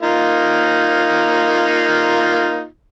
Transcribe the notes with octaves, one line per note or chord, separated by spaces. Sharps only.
A#3 D#4 F4